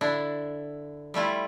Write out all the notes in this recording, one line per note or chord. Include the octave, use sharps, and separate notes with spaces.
D3 D4 E4
G3 A3 E4 F4